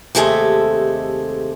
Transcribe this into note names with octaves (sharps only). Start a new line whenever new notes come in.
D#2 C3 G#3 A3 A4 G#5